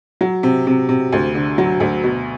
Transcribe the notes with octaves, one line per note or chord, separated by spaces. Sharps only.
F#3
C3
C3
C3
D2
D3
F#3
D2
B2